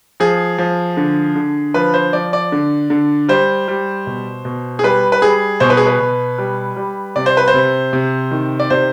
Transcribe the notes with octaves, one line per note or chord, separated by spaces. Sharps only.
F3 G#4
F3
D3
D3
F3 B4
C5
F3 D5
D5
D3
D3
G3 C5
G3
B2
B2
G#4
G3 B4
B4
G3 G#4
B2 C5
B4
G#4
B4
B2
G3
G3
C3 D5
C5
B4
C5
C3
C3
D#3
D5
C3 C5